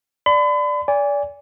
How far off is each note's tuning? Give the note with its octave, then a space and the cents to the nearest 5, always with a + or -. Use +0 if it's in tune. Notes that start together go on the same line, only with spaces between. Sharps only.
D5 +0 B5 +40
D5 -30 G#5 -25